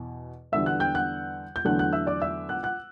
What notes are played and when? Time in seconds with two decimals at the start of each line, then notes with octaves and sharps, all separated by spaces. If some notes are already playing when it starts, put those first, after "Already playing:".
Already playing: E2 B2
0.52 E2 D3 G3 B3 D4 E5 E6
0.66 F#5 F#6
0.80 G5 G6
0.95 F#5 F#6
1.56 G6
1.65 E2 D3 F#3 A3 D4 F#5 F#6
1.79 F#5 F#6
1.93 E5 E6
2.07 D5 D6
2.22 E5 E6
2.49 F#5 F#6
2.63 F#5 F#6